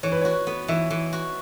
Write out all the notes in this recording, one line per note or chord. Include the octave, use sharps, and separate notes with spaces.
E3 C#5
B4
F#4 C#5
B3
E3 E5
E3
F#4